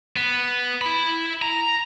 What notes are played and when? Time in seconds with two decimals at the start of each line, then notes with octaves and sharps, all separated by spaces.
0.16 B3
0.81 E4 B5
1.42 A#5